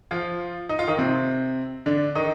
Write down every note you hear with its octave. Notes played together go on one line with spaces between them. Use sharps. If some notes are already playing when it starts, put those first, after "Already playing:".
F3 F4
D#4
F4
D#3 D#4
C3 C4
D3 D4
D#3 D#4